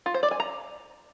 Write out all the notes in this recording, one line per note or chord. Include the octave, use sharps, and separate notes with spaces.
F4
C5
D5
G#5
A#5